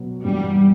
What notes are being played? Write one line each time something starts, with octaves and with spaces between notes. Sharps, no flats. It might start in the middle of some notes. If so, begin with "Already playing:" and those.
Already playing: B2 F#3 B3
G2 E3 G3 B3 E4